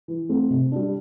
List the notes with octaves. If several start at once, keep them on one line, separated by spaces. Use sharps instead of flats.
E3
A3 C4
C3
G3 D4